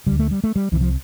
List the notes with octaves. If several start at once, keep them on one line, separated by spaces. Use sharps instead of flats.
D2 D3 G3
A3
G3
A3
G3
C2 C3 E3
F3